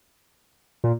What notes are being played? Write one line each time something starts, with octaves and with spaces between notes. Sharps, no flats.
A#2